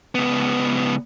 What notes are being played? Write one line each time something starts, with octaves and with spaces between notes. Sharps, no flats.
C#2 B3